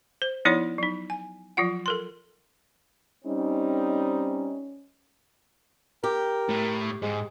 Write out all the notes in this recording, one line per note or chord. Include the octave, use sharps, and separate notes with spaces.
C5
F3 B3 D#4 E4 C#5 D5
F#3 D#4
G#5
F3 F#3 F4 F#5
A4 A#4 C6
G3 C4 C#4 D#4
G4 A#4
A2
G#2 G#3